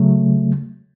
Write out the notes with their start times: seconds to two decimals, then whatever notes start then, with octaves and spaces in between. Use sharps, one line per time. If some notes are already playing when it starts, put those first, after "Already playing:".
Already playing: C#3 F#3 A3